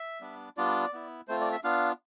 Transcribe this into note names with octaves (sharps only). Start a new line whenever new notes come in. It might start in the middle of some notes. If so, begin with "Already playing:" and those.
Already playing: E5
G3 B3 D4
G3 B3 D4 F4 D5
B3 E4
A3 C4 F4 C5
D5
E5
B3 D4 F4 F5